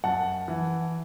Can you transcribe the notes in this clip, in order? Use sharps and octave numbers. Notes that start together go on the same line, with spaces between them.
F#2 F#5 A5
E3